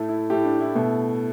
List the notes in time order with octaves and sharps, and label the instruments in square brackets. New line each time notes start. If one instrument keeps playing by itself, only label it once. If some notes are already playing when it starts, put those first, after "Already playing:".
Already playing: [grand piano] A2 A3
E4
A2 A3 G4
D4
E4
B2 A3